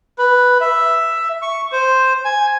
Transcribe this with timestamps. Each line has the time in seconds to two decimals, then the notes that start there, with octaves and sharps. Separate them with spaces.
0.18 B4
0.61 E5
1.42 C#6
1.72 C5
2.25 G#5